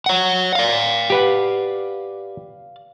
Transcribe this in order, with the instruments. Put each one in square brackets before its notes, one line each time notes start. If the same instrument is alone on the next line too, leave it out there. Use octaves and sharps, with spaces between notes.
[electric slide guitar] C#5 F#5
D5 F5
[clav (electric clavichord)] G4 B4 F#5